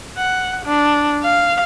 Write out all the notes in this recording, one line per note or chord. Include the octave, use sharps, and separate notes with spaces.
F#5
D4
F5